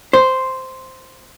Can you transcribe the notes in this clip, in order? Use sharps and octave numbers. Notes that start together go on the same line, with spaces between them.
C5